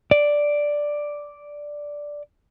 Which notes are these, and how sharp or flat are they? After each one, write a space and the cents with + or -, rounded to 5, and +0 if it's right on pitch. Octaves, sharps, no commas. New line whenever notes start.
D5 +0